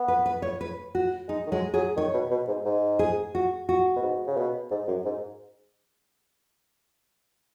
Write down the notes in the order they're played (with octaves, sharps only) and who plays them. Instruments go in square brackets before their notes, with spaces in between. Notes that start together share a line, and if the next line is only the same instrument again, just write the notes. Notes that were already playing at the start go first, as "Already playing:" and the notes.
Already playing: [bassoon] B3
[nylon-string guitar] B4
B4
C#5
B4
F#4
[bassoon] G#3 [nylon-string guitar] D#4
[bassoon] D#3
[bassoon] F#3 [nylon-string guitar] G#3
[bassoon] F#3 [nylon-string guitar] G#4
[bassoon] D#3 [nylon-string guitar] C#5
[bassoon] B2
B2
G#2
G#2
[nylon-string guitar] G#4
F#4
F#4
[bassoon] B2
G#2
C#3
B2
G#2
F#2
G#2